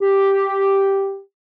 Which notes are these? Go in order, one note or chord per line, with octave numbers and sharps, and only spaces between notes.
G4